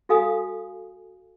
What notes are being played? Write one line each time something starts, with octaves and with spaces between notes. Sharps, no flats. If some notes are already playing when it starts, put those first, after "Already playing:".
F#4 A4 F5 G#5 D#6